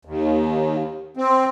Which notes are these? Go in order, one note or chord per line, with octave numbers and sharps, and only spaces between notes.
D#2
C4